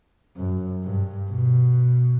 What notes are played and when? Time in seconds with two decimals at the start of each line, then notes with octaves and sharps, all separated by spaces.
0.36 F#2
0.84 G2
1.29 B2